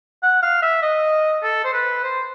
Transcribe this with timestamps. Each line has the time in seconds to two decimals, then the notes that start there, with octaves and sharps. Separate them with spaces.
0.23 F#5
0.42 F5
0.62 E5
0.82 D#5
1.43 A4
1.64 C5
1.73 B4
2.03 C5